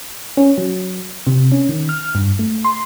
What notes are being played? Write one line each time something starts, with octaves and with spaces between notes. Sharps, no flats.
C#4
F#3
C3
C#4
D#3
F6
G2
A3
C6